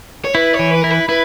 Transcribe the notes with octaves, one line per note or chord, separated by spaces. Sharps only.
C#5
E4 B4
C#5
E3
B4
E4 A#4
B4
E4 B4